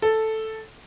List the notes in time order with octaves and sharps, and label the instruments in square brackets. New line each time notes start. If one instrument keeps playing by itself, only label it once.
[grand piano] A4